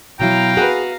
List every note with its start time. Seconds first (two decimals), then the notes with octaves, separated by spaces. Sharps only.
0.20 B2 F#3 E4 F5 G5 A#5
0.57 F#4 G#4 B4